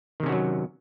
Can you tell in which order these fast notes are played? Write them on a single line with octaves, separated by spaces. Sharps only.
D#3 C3 C#4 F#4 F#3